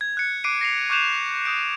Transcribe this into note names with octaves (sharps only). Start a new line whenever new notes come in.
G#6
F#6 C#7
D6 F#6 C7 D7 D#7
A#6 C7 F7
C#6 D6 F#6 G6 E7 F7
D#6 G6 D7